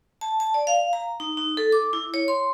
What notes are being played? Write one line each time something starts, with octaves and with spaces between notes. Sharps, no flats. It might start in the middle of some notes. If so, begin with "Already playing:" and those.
A5
A5
D5
F5
A#5
D#4
D#4
A4
D6
E4
C#5
C6